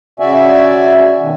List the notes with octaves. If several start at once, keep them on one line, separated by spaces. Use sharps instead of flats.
C#3 F#4 D5 E5 G#5
B2 D#3